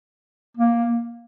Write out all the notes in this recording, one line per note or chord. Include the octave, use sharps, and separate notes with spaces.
A#3